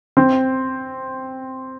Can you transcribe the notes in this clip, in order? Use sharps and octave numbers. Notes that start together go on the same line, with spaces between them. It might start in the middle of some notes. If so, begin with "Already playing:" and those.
C4